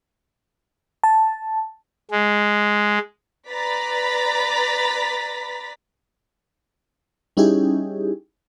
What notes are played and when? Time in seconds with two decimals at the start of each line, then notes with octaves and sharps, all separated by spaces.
1.04 A5
2.11 G#3
3.49 B4 D5 A#5 B5 A6 B6
7.37 G3 C#4 D#4 E4 G4 G#4